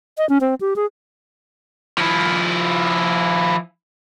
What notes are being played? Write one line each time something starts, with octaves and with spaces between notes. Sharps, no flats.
D#5
C#4
C4
G4
G#4
F3 E4